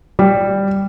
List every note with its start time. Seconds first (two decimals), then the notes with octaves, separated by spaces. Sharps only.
0.19 G3